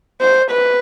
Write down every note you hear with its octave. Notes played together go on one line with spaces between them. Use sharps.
C5
B4